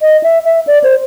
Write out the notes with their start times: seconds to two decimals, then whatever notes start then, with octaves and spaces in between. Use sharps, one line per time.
0.02 D#5
0.23 E5
0.45 E5
0.67 D5
0.84 C5